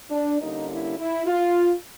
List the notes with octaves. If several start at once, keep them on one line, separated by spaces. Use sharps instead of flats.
D4
D3 G3 A#3 C#4 D#4
E4
E4
F4